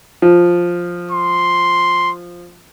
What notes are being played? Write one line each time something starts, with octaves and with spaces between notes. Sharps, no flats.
F3
C6